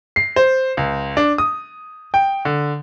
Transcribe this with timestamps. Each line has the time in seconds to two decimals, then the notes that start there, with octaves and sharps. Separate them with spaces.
0.16 C7
0.36 C5
0.77 C#2
1.17 D4
1.38 D#6
2.14 G5
2.45 D3